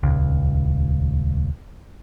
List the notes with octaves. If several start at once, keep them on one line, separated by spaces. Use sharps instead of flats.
D#1 C#2